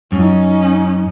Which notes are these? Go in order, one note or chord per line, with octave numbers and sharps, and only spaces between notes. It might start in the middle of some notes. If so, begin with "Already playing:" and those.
F#2 C#4 D#4